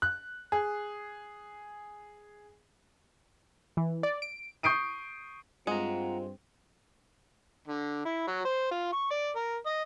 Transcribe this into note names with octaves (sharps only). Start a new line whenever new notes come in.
F#6
G#4
E3
D5
D7
C#6 D#6 G6 C7 D7 D#7
G2 G#3 C4 F4 F#5 A#5
D3
E4
F#3
C5
F4
C#6
D5
A#4
D#5